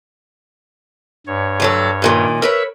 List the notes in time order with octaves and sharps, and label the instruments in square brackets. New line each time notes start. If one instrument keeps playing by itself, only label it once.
[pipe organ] G2 C#5
[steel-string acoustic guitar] D2 F#3 A4
F#2 A#2 D#3
[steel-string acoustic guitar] A#4 B4 C#5 [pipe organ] E5 E6